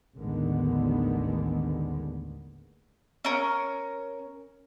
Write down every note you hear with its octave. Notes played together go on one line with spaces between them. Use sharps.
A1 D#2 D3 D#3 G#3 B3
C#4 A#4